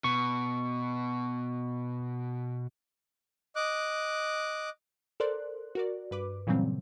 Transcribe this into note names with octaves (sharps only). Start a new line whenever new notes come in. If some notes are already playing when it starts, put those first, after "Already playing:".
B2 C#6
D#5 D6 F#6
A4 A#4 C5 D5 C6 F#6
F#4 A#4 D5
G2 B4 D6
A#2 C#3 E3 F#3 G3 C4